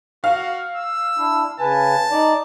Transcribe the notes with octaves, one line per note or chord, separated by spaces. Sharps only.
F#4 F5
E6
D4 E4
C#3 B4 G#5 A5
D#4 D5